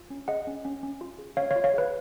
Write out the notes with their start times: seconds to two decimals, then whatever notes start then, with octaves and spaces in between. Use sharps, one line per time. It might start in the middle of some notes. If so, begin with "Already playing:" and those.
Already playing: F4
0.10 C#4
0.28 G#4 D#5 F#5
0.47 C#4
0.65 C#4
0.83 C#4
1.01 F4
1.19 G#4
1.37 C#4 C#5 F5
1.51 C#5 F5
1.56 F4
1.64 C#5 F5
1.73 G#4 B4